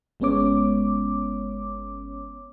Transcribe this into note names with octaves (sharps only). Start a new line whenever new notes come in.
G1 G#3 B3 C#4 C#5 D6